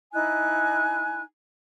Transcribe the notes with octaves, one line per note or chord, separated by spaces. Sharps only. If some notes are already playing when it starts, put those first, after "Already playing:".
D#4 E4 G#5 F#6